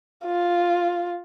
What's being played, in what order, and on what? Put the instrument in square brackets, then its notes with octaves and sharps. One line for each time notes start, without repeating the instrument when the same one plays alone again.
[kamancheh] F4